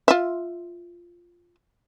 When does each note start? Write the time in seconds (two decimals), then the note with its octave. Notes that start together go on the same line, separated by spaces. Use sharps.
0.08 F4 E5